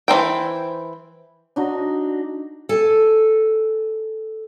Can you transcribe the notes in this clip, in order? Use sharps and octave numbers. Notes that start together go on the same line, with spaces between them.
E3 D#4 C5 G5
D4 D#4 F#4
A4 G#5